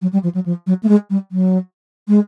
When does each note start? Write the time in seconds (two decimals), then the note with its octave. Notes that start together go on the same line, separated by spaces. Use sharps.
0.02 F#3
0.13 G3
0.23 F3
0.34 F#3
0.46 F3
0.67 F#3
0.83 A3
0.89 G#3
1.10 G3
1.32 F#3
2.08 G#3